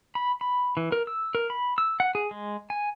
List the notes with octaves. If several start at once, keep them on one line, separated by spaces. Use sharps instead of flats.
B5
B5
E3
A#4
E6
A#4
B5
E6
F#5
G#4
G#3
G#5